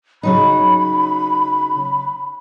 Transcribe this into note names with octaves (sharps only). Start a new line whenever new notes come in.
C#3 F#3 D#4 B5